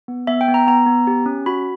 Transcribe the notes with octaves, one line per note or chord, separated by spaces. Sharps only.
B3
B3 E5
G5
B3
A#5
B3 A#5
B3
G4
C#4
F#4 B5